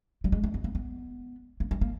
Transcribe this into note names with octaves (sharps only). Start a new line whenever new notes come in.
G3
G#3
A3
B3
A#3
B3
A#3
G#3
A#3